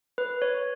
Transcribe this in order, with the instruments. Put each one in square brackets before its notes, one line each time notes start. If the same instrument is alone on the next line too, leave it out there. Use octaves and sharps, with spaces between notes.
[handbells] B4
C#5